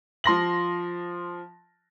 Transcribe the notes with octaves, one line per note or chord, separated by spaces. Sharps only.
F3 C6 A#6 F#7